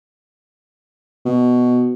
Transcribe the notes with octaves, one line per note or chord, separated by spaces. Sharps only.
B2